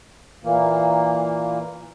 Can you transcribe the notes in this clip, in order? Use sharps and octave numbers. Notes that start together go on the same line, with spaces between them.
A#2 E3 A#3